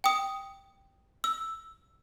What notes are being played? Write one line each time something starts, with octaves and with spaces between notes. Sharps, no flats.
G5 D#6
E6